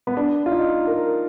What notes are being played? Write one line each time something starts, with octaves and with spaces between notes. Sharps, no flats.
B3
D4
F4
D#4
A#4